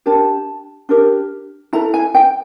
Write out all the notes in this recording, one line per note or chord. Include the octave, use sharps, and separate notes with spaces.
D4 G4 A#4 A5
D4 G4 A#4
E4 A4 A#5
G#5
G5